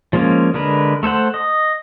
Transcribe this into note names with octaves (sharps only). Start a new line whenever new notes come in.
F3 G#3 A#3 C#4
D3 G#3 A#4 B4
A3 A4 C5 F#5
D#5